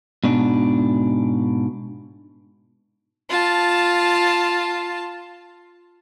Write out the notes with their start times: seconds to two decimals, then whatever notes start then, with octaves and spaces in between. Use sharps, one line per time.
0.24 G#2 B2 D4
3.29 F4 A5